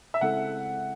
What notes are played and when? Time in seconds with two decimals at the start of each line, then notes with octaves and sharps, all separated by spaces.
0.14 E5
0.21 C#3 G#3 C4 E4 A4 F#5